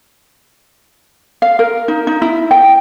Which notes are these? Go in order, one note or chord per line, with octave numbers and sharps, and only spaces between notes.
F5
A#4
D#4
D#4
E4
G5